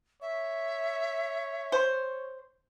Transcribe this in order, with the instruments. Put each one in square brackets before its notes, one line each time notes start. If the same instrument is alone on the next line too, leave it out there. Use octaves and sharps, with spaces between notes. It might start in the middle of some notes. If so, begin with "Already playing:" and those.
[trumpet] C#5 [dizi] E5
[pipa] C5